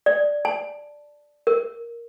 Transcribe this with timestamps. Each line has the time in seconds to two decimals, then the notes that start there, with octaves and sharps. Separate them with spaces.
0.06 D5
0.45 A5
1.47 A#4